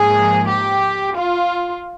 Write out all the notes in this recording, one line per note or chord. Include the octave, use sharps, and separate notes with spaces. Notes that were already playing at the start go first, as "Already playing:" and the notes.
Already playing: G#2 F3 A#3 G#4
G4
F4